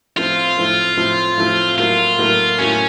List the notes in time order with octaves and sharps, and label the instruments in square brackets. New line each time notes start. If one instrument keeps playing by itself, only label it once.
[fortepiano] A2 F3 C4 [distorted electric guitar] F4
[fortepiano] A2 F3 C4
A2 F3 C4
A2 F3 C4
[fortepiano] A2 F#3 A#3 [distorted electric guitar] F4
[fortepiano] A2 F#3 A#3
[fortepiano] A2 F#3 A#3 [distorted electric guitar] C#4